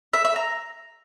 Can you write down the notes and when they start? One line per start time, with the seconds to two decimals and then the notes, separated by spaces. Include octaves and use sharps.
0.13 E5
0.25 E5
0.36 A#5